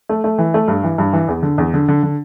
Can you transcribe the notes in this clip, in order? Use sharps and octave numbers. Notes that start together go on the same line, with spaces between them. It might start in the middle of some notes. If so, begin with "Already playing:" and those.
A3
A3
E3
A3
G2
E3
G2
E3
E2
D3
E2
D3
D3
D3